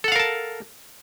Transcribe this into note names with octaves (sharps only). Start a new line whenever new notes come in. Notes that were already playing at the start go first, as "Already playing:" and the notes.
A4 A#4 F5 F#5 A5